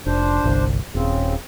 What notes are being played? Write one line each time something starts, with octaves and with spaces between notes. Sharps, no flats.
F1 D4 C5
G1 C2
D#1 C#3 C4